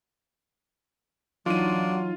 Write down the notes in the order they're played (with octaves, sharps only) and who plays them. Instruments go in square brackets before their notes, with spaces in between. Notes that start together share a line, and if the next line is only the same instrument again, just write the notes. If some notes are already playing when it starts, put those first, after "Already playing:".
[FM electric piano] E3 D#4 [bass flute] F#3 [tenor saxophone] D4 [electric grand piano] F4 D#7